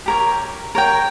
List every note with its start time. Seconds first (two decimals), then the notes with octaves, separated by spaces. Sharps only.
0.06 G4 A#4 C#5
0.75 A#4 C#5 G5